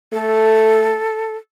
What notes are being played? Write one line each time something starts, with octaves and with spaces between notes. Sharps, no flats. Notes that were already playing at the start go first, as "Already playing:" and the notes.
A3 A4